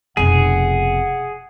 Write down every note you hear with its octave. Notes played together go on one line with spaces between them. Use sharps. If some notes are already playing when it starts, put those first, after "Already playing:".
F1 B2 G#4 F#5